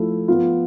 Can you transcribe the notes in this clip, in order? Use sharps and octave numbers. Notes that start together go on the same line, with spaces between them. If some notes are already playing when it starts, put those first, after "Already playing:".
Already playing: F3 A3 E4
F3 B3 F4